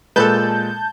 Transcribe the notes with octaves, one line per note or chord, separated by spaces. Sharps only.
A#2 G#3 A4 B4 A5 G6